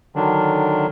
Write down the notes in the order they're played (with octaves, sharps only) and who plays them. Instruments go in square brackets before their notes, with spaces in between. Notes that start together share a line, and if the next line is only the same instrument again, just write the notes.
[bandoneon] D3 D#3 F#3 D4